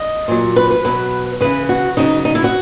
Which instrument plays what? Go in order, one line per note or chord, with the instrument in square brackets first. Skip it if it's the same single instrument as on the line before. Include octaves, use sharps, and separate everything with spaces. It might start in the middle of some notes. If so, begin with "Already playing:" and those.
Already playing: [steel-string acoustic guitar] D#5
A#2 F#3
B4
B4
B2 F#3 B4
C#3 E3 B4
F#4
C#3 F#3 D#4
D#4
E4
F#4